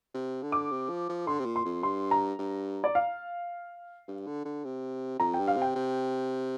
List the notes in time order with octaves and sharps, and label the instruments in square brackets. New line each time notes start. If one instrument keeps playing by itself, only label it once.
[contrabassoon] C3
D3
[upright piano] D6
[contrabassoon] C3
F3
F3
[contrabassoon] D3 [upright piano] C6
[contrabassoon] C3
A#2
[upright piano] C6
[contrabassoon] F2
[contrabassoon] G2 [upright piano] C6
[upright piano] A#5
[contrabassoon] G2
[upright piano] D5
F5
[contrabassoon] G2
D3
D3
C3
[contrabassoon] F2 [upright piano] A#5
[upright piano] G5
[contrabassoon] G2
[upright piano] F5
[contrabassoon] C3 [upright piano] G5
[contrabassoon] C3